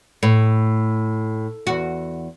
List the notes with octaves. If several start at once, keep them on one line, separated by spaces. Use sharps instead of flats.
A2
E2 F#4